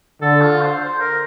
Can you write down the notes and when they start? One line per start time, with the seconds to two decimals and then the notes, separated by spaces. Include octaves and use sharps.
0.21 D3 A4
0.41 F4
0.61 C5
0.81 C5
1.00 A#4